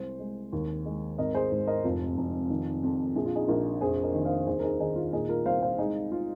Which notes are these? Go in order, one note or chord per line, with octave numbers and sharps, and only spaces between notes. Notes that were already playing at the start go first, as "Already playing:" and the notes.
Already playing: C2 G#3 C5
G#3
D#2
G#3
G#1 A#4 D#5
G#4 C5
G#2
A#4 D#5
F1 F4
F1
D#3
F2
A#1 G#4
F4
D#4 G#4
A#1 F4 A#4
F1 G#4 C5
A#4 D#5
D#3
C5 F5
D#2 G#4 C5
A#4
D#4 G#4
D#3 D#4 G#4
F4
A#2 D#4 G#4
F4 A#4
C2 C5 F5
C5 F5
G#3 D#4 G#4
F4